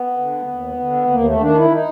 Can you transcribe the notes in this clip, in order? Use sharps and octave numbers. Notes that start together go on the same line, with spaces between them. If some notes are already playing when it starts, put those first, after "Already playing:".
Already playing: B3
D3
D#2
D3
D#2 A#3
A3
D#3 D4
E4
D#4